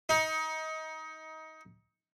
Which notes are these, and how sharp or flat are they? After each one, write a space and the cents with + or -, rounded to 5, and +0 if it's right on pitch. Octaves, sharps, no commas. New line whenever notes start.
D#4 +25